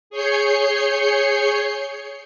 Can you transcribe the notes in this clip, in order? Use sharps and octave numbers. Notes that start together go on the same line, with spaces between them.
G#4 C#5 G6 C7 C#7